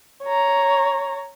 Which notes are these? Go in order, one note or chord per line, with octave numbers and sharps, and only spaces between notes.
C#5 A#5